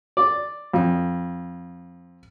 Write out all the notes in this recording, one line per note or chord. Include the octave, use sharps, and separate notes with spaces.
D5
F2